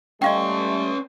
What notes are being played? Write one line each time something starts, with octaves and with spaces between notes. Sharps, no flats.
G3 A3 C#4 D#5 F5 G5 C6 C#6